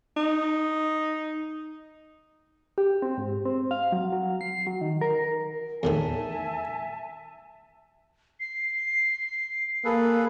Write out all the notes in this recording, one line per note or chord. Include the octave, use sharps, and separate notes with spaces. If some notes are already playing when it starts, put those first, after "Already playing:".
D#4
G4
C4
G#2
C4
F5
F#3
F#3
C7
F#3
D#3
A#4
E2 A2 D#3 E5 G#5 A5
C7
A#3 G#4 A4 B4